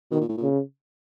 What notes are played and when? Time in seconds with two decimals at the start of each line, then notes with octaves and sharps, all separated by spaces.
0.11 B2 D#3
0.21 A#2
0.29 A2
0.37 A#2 C#3